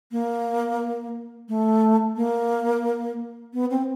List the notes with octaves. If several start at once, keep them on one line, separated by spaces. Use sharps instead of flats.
A#3
A3
A#3
B3
C4